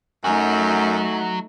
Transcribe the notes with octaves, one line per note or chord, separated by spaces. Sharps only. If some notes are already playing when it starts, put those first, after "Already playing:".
F#2 F#3 A3 D#4 F#4 G#5